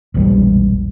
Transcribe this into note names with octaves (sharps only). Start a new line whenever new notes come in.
E1 A#1 E3 G3